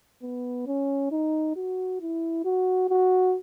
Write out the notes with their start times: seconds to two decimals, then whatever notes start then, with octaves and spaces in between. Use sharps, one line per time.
0.23 B3
0.67 C#4
1.12 D#4
1.56 F#4
2.01 E4
2.45 F#4
2.90 F#4